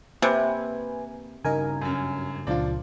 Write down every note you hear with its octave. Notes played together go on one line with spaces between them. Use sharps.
C3 A#3 B4 G#5
G2 C#3 D#4 A#4 G#5
F#2 C#4 G#5
C#2 A#2 F3 D4 F4